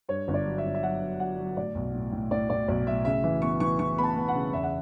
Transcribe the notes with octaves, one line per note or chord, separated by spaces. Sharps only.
G2 C#5
G1
D5
F#3
E5
G1
E5
F#3 F#5
F#3
F#3 F#5
F#3
A2 D5
B1
A2
A2
A2 D5
A2 D5
B1 D5
A2 E5
C#3 E5
E3 E5
B3 C#6
E3 C#6
E3 C#6
B3 B5
A5
B3
F#5
C#3
E2 E5
F#5